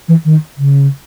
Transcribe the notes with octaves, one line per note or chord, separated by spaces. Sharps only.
E3
D#3
C#3